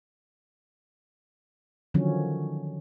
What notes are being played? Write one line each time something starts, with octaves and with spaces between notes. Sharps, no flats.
D3 D#3 F3 F#3 C#4